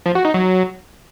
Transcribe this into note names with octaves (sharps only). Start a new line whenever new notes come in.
F3
F#4
D#4
F#3